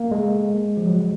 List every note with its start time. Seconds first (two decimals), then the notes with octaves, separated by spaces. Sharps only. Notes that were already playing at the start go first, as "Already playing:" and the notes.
Already playing: A#3
0.11 G#3
0.77 F3
0.86 F#3